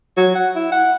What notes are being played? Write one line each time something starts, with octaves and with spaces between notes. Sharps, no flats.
F#3
F#5
E4
F#5